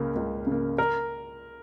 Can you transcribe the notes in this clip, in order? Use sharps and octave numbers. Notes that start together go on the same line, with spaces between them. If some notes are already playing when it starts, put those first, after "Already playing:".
Already playing: C#2 C#3 A#3
C#2
C#3 A#3
A#4